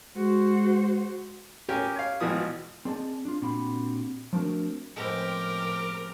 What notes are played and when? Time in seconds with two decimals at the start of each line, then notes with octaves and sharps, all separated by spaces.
0.16 G#3 F#4 C5
1.69 C#4 G4 G#4 A#4 G#5 D6
1.96 C#5 F5
2.20 G#1 B2 E3 F3 D#6
2.85 C4 G#4 D5 D#5 F#5 A5
3.25 D4 F4
3.42 A#2 C4 D4 F#4 G4 B5
4.33 F3 A3 C4 D4 F#4 A#4
4.96 A2 F3 G#3 B3 C4 G4 A#4